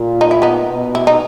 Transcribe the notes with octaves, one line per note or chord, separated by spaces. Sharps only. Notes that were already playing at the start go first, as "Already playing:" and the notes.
Already playing: A#2
D#4
E4
B3 D#4
B2
E4
D#4